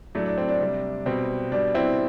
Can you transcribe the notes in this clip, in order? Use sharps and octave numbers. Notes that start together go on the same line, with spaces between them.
A2 F#3 A3 D4
D4
C4
D4
C3 G3
B2 G3 C4
B2 G3 D4
C4 E4